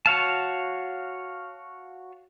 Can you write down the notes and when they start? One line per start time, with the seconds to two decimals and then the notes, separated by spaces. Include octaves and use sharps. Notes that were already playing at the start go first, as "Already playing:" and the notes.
0.06 F#4 C#5 F5 A5